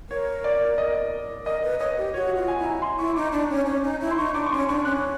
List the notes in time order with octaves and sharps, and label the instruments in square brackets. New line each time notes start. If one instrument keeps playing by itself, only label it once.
[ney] A#4 [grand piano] C#5
[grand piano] D5
D#5
[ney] A#4 [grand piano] D#5
[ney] B4
[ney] C#5 [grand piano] D#5
[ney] G4
[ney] F#4 [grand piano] C#5
[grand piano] F#5
[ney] F4
[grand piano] G#5
[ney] E4
[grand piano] A#5
C6
[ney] E4 [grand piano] C#6
[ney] D#4 [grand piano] D6
[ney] D4 [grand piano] C#6
[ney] C#4
C#4
D#4
E4
[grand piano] C6
[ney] D#4 [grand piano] C#6
[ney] D4 [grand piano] D6
[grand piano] C#6
[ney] C#4 [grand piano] C6
[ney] D4 [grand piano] C#6
[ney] C#4 [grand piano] F#6